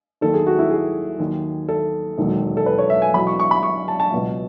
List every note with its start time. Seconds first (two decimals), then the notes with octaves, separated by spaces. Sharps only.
0.21 D#2 D#3 F#3 A4
0.34 G#4
0.47 F#4
0.59 E4
0.71 G#4
1.19 D#2 D#3 F#3
1.68 A4
2.18 E1 D#2 D#3 F#3
2.57 A4
2.66 B4
2.78 C#5
2.90 E5
3.02 G#5
3.14 E2 B2 F#3 B5
3.27 C#6
3.40 C#6
3.51 B5
3.63 C#6
3.88 A5
4.00 A5
4.12 C#2 B2 F#3